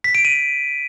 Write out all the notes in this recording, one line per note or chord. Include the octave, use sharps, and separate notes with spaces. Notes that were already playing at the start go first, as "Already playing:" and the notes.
B6
D7
D#7